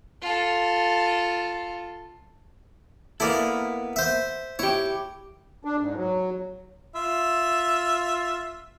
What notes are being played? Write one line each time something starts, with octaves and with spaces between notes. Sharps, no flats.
F4 A4
A#3 B3 E4 A4 D5
C5 E5
E4 G4 C#5
D4
G#2
F#3
F4 E5